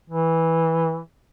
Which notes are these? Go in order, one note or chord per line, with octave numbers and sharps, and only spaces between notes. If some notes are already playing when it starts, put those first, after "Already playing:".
E3